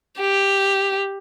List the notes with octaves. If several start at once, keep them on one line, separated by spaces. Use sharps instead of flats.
G4